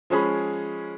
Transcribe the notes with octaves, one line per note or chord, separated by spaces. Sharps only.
F3 G#3 C#4 G#4 B5